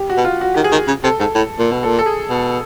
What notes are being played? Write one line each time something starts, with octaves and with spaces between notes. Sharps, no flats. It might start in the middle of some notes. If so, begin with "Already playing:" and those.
Already playing: G4
F#4
B2
F4
F#4
D#3 G4
G#4
D#3
C#3
C3 A4
G#2 A4
A2
A#2
B2
A#2 A4
A4
G#4
B2